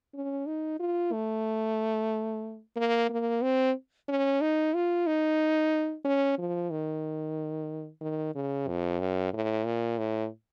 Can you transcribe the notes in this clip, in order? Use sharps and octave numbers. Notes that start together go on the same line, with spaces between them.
C#4
D#4
F4
A3
A#3
A#3
C4
C#4
D#4
F4
D#4
C#4
F3
D#3
D#3
C#3
F2
F#2
A2
A#2
A2